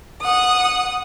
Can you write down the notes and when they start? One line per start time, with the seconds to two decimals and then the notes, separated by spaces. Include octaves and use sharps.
0.20 F#5 D#6